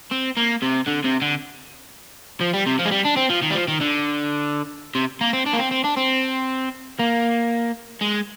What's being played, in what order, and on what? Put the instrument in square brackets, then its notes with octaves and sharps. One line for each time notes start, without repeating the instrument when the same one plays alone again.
[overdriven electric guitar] C4
A#3
C3
D3
C3
D3
F3
G3
C3
F3
G#3
G3
D4
C4
F3
D#3
G3
F3
D#3
D3
C3
A#3
C4
D4
A#3
C4
C4
D4
C4
A#3
G#3